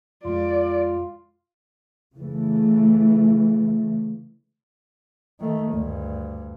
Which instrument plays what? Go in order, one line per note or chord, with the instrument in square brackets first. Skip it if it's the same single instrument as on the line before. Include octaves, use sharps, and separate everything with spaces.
[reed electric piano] F2 G#3 [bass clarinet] F4 [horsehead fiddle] D5
[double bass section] C#3 E3 A3
[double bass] D#3 A3
D2 G2